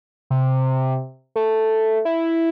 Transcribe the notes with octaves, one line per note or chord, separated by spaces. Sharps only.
C3
A3
E4